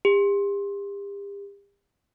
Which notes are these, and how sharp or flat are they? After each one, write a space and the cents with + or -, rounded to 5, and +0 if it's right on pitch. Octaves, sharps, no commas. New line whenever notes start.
G4 +40